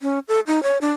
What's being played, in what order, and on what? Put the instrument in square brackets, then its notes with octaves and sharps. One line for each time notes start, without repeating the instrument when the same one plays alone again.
[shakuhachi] C#4
A4
D#4
C#5
D4